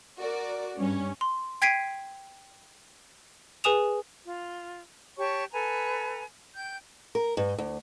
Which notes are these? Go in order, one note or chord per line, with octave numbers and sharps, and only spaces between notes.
F#4 A#4 D5
G2 C#4
C6
G5 G#6 B6 C7 D7 D#7
G#4 B4 G#5 D#6 E7 F7
F4
G4 C#5 A5 C#6
A4 B4 G#5 A#5
G5 G6
A#4
G2
D2